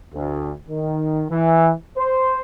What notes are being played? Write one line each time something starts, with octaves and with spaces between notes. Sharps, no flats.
D2
D#3
E3
C5